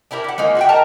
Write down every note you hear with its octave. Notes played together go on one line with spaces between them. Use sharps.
D4 E4 G4 A#4
G4 F#5
G#3 A#3 D#4 F4
F#4 E5 G5
A#4 D#5 A5 A#5